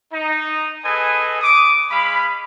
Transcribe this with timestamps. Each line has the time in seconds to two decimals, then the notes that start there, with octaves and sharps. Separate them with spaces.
0.12 D#4
0.84 G#4 A4 B4 D#5 G#5
1.41 D6 D#6
1.90 G#3 F5 B5